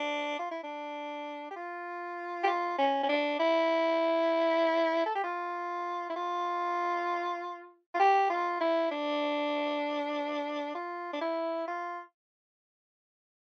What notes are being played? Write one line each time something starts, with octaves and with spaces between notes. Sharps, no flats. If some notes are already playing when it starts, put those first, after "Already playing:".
Already playing: D4
F4
E4
D4
G4
F4
G4
F4
C#4
C#4
D4
E4
A4
G4
F4
E4
F4
F4
G4
F4
E4
D4
F4
D4
E4
F4